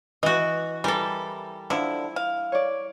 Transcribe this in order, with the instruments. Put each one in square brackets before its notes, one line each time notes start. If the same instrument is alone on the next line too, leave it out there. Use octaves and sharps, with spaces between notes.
[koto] E3 F#4 [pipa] D#5
[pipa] E3 [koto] G3 A4 [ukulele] A#4
[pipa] D3 F3 [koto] E4
[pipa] F5
[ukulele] C#5 D5